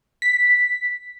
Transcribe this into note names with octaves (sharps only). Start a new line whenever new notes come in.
B6